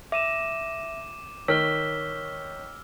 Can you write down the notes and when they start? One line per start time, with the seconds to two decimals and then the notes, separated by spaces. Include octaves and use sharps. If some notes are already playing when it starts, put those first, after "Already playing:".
0.12 E5 D6 D#7 E7
1.48 D#3 C#5 E6 F6 B6 G7